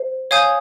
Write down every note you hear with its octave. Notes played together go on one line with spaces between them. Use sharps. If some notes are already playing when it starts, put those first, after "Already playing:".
Already playing: C5
C#5 F5 G#5 D#6 G6